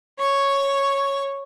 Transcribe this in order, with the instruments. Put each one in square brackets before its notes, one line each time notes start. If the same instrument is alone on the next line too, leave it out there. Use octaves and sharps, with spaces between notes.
[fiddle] C#5 C#6